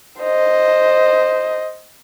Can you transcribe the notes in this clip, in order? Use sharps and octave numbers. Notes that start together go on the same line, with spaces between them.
C5 D#5